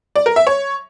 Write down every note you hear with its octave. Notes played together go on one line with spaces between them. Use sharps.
D5
A#4
E5
C#5